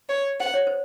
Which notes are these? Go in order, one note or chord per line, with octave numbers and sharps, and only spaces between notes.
C#5
C5 F#5
C#5
C5